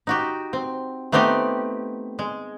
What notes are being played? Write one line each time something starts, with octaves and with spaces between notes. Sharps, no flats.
D#4 F#4 G4
C4
A3 B3 C4 D#4 G4
G#3